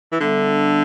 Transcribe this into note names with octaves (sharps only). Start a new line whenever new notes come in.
E3
D3 G3 B3 D4 A4 E5